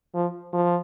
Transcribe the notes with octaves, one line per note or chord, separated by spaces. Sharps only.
F3
F3